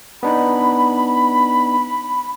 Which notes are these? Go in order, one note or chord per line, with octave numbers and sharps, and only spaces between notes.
B3 D4 D#4 B5